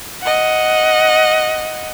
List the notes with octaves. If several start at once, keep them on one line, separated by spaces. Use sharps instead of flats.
D#5 F#5